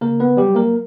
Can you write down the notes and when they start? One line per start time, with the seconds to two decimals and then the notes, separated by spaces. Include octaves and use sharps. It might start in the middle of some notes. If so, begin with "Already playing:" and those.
0.01 C#3 A#3 A#4
0.20 B3 B4
0.37 F#3 G3 G4
0.55 A#3 A#4